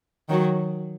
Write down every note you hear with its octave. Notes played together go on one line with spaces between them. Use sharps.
D#3 F#3